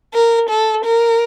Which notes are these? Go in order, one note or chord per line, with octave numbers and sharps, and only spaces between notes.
A#4
A4
A#4